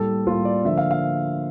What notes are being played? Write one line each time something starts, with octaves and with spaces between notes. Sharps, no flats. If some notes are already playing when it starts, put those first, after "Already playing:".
Already playing: A2 G3 A#3 A4
A2 G3 A#3 F4
D5
D3 F3 A#3 E5
F5
F5